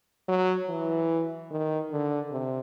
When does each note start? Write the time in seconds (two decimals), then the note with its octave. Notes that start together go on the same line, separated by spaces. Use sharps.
0.28 F#3
0.69 E3
1.50 D#3
1.92 D3
2.32 C3